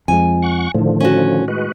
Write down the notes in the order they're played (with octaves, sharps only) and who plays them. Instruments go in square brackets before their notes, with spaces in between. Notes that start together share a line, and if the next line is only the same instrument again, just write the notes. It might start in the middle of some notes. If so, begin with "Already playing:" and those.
[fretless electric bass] F2 F3 G#3 [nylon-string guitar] G#5
[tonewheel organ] F#5 C#6
[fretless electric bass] A2 D#3 [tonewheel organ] D3 F3
[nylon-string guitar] C#4 F#4
[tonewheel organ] G#3 F#4 B4